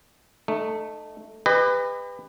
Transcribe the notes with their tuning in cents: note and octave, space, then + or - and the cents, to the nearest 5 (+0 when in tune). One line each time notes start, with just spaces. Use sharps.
A3 +0 D#4 -25
G4 +40 B4 +20 D#5 -20